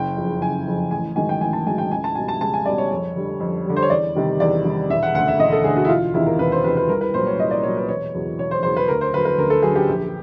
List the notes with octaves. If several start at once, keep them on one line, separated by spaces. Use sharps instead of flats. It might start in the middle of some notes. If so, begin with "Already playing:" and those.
Already playing: F#1 G5
F2 C#3 F3
F#1 G#5
F2 C#3 F3
A1 G#5
G#2 D#3 F#3 G#5
G5
A1 G#5
A5
G#2 D#3 F#3 G#5
G5
C#2 G#5
A5
B2 G3 G#5
A5
C#2 A5
G#5
B2 G3 D5
C#5
F2
D3 G3
F2
D3 G3
C5
C#5
E2 D5
C3 D#3 G3
E2 D5
C3 D#3 G3
E1 E5
F#5
D2 D3 F#5
E5
E1 D#5
A4
D2 D3 G#4
F#4
E4
E1 F4
E2 C3 D#3 E4
A#4
E1 B4
C5
E2 C3 D#3 B4
B4
C2 A#4
B4
A#2 F#3 C5
C#5
C2 D#5
D5
A#2 F#3 C#5
B4
E1 C#5
E2 C#3 F#3
E1 C#5
C5
E2 C#3 F#3 C5
B4
D2 A#4
C5
D3 F#3 B4
B4
D2 A#4
A4
D3 F#3 G#4
G4
A#1